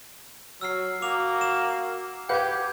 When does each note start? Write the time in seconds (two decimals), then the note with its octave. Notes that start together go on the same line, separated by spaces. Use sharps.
0.61 F#3 E6 F6 C7
1.02 A#3 F#4 D6 F7
1.41 E7
2.29 G4 B4 F5 F#5 G6 G#6